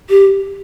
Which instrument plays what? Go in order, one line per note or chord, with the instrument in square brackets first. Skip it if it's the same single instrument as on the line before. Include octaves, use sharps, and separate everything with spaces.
[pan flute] G4